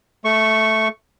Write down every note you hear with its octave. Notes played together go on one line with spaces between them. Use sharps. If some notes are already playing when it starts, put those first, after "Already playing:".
A3 C#6